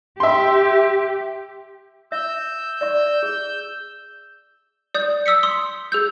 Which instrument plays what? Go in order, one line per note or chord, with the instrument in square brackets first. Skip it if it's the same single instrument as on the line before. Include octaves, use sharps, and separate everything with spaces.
[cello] G4 [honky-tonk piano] E5 C6
[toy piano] E5 [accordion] E6 G6
[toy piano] D5 E5 C#6
G#4
[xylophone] D5 D#6 G6
D#6 E6 B6 C#7
C6 D#6
G#4 E6 G6